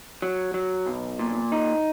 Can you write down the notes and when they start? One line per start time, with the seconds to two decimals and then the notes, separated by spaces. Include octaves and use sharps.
0.22 F#3
0.54 F#3
0.86 B1
1.19 A#2
1.52 D#4